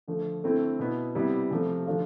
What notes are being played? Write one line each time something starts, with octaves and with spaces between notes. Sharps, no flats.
D3 F3 A3
D3 A3 C4 E4
B2 B3 E4
C3 G3 B3 E4
C3 F3 A3
D3 F3 A3 D4 F4